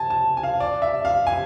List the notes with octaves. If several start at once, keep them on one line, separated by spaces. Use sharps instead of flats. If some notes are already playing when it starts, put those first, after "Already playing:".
Already playing: G#5 A5
A5
G#5
F5
D5
E5
F5
G#5